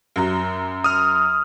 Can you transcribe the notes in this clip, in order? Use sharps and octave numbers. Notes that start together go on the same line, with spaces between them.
F#2 F#3
D#6 F6